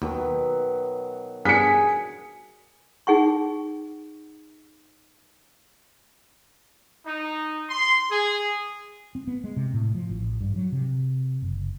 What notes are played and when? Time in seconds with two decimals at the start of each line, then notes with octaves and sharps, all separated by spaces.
0.02 D#2 B2 D#3 F#3
1.45 G2 B3 D4 G#4 B6 C#7
3.07 D#4 G#4 F#5 C#6
7.06 D#4
7.69 C6
8.11 G#4
9.15 C4
9.27 B3
9.44 G#3
9.56 C3
9.73 A2
9.95 F3
10.09 A1
10.41 G2
10.56 F#3
10.72 C3
11.42 F#1